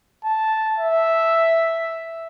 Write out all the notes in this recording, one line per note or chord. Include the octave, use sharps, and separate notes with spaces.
A5
E5